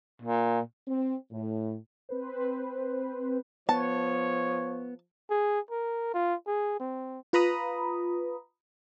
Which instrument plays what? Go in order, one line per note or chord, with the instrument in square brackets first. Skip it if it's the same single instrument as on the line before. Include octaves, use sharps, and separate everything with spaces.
[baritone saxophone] A#2
[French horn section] C4
A2
[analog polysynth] C4 B4 C5
[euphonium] F3 [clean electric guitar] B3 [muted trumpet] C#5 [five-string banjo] A5
[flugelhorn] G#4
A#4
F4
G#4
C4
[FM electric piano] F4 B4 A#5 B5 D#6